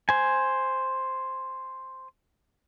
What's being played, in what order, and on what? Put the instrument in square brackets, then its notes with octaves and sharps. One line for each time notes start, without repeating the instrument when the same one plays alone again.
[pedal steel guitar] C5 G#5